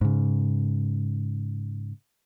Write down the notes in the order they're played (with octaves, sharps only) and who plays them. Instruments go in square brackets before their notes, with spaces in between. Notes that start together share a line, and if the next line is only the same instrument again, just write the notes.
[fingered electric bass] G#2 C#3